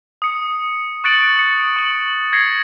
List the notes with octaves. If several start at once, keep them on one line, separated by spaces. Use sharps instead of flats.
D#6 C#7
C#6 F#6 A6 C#7 D7 F#7
D#6 C#7
C#6 F#7
G#6 A#6 C7 C#7